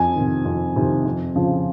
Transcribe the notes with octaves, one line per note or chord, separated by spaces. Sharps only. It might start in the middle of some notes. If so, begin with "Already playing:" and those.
Already playing: F2 G#5
C3 D#3
F2
C3 D#3
F2
C#3 F3